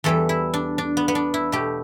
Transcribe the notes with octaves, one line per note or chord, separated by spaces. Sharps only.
E2 E3 G3 A4
E4
D4
D4
B3
B3
D4
E4
B2 A3 G4